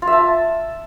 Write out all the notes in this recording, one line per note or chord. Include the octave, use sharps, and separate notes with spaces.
F4
E5
A5